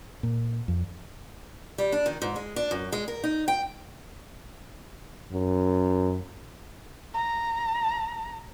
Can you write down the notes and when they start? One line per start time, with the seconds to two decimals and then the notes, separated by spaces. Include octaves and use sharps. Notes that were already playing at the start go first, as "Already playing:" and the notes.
0.23 A#2
0.68 F2
1.78 G3
1.92 D4
2.06 D#3
2.22 G#2
2.36 G#3
2.56 D4
2.71 F#2
2.92 G#3
3.08 A#4
3.24 D#4
3.48 G5
5.33 F#2
7.14 A#5